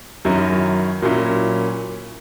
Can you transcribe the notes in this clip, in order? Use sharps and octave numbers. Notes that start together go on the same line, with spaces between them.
F#2 D#3 F#3 C#4 E4
A#2 F#3 C#4 E4